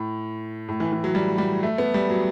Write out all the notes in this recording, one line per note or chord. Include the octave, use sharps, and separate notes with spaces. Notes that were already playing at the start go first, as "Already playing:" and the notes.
Already playing: A2
A2
E3
E3
F#3
G3
G3
A3
B3
G3
F#3